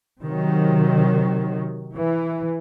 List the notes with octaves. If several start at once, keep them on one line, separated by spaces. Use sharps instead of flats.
C3 D#3 F#3
E3